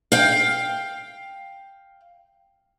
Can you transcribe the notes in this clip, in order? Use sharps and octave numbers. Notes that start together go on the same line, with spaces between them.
F5 G5